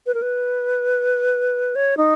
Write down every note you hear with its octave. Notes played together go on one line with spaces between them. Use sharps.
B4
A#4
B4
C#5
D#4